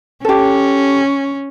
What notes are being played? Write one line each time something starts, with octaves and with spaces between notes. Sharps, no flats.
C#4 G4 A4